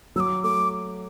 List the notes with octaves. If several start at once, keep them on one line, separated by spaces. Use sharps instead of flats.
F#3 D6 E6
A3 D6